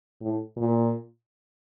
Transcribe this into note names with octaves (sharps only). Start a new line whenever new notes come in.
A2
A#2